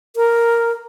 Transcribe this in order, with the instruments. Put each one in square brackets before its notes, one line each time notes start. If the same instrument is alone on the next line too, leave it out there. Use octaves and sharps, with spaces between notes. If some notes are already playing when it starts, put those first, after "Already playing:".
[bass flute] A#4